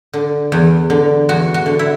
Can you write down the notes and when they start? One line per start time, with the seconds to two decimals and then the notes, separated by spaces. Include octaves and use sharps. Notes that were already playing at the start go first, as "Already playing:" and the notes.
0.13 D3
0.52 E2
0.90 D3
1.29 E2 F#4
1.54 F#4
1.66 D3
1.79 E4